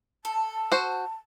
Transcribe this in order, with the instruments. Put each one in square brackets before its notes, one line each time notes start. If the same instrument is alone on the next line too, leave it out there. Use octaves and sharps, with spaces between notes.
[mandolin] A4 [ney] A5
[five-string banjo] F#4 C5